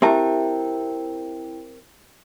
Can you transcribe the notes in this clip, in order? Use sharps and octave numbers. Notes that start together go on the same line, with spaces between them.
C4 E4 G4 A#4 E5 G5 A5